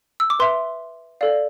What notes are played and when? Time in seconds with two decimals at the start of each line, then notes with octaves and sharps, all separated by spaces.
0.20 E6
0.30 D6
0.40 B4 E5 C6
1.21 A4 D5 F5